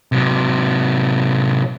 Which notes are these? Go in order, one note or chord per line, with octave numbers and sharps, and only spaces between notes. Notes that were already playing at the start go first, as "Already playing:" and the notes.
C3 F#3